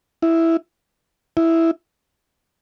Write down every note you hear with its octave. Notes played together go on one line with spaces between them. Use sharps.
E4
E4